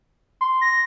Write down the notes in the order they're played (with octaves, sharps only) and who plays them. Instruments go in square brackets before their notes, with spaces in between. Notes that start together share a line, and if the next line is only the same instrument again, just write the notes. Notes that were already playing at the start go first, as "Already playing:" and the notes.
[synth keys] C6
[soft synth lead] A#6